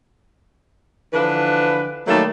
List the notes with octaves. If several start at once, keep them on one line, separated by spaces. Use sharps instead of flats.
D3 E3 F3 D4 B4
D#3 F#3 G3 A3 A#3 A4